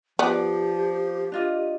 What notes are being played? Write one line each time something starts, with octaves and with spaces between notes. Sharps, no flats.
F3 B3 G4 D5
D4 F4 D#5